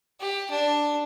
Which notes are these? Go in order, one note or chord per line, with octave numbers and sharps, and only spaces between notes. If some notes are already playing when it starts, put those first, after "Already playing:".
G4
D4